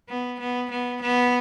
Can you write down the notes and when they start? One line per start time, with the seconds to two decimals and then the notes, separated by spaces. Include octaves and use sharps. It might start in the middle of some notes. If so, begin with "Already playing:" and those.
0.09 B3
0.40 B3
0.71 B3
1.02 B3